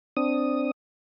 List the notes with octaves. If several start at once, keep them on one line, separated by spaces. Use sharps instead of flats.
C4 D4 D#6